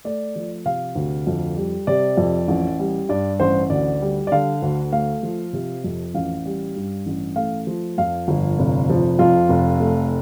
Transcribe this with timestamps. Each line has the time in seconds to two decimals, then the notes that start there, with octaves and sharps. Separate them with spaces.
0.05 A3 D5
0.36 F3
0.66 C3 F5
0.95 D2
1.27 F2
1.57 G3
1.87 C3 D5
2.17 F2
2.48 A1
2.79 G3
3.09 G2 D5
3.40 A1 C5
3.70 D2 D5
4.01 G3
4.27 D5
4.32 D3 F5
4.62 D2
4.92 A3 F5
5.23 F3
5.53 C3
5.84 F2
6.14 A1 F5
6.46 G3
6.76 G2
7.07 A1
7.36 A3 F5
7.67 F3
7.98 F2 F5
8.28 G1
8.59 F1
8.90 F3
9.19 F2 F4
9.49 F1
9.80 A3